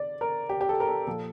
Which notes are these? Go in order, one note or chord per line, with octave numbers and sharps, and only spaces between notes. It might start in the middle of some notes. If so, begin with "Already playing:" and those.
Already playing: D5
A#4
G4
G4
A4
A#4
A4
A#2 F3 A4